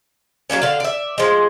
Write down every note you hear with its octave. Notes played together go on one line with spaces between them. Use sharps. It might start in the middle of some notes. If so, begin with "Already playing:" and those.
F#3 G3 A#3 C#4
D3 F5
D5 E5
F3 G#3